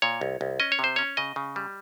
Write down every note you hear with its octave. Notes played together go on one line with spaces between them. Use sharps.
A#2 C#5
C2
C2
C#4 D#5
C#5
C3 C5
C#4 C#5
C#3 D#5
C#3
G3